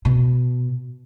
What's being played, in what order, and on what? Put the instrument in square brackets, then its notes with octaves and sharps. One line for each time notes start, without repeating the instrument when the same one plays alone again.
[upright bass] B2